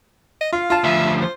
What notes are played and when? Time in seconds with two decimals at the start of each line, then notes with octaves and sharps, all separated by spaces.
0.41 D#5
0.53 F4 F5
0.70 F4 A5
0.84 D2 F3 E5
1.22 C5